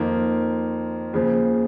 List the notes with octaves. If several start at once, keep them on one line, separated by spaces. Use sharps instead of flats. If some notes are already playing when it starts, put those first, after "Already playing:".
Already playing: F2 D#3 A#3 F4
D#2 C#3 F3